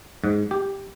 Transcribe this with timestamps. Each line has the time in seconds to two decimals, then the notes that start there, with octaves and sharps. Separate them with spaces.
0.24 G#2
0.51 G4